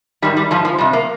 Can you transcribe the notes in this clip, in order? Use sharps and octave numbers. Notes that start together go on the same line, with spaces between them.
G#2 D#3 G3
G3
G#2 F3 G3
F3
F2 C3 G3
A#3